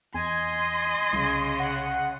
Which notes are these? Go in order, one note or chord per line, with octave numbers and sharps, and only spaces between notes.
E2 D#5 G#5 C6
C2 C#3
F#5